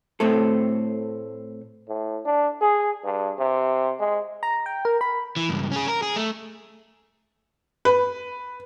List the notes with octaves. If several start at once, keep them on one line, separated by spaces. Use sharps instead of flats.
A2 A3 C4 A4
A2
D4
G#4
G2
C3
G#3
A#5
G5
A#4
B5
E3
C#2 G2
C#4 G#4
A#4
G#4
A3
B4